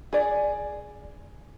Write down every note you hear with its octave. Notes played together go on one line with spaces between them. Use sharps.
G#4 D5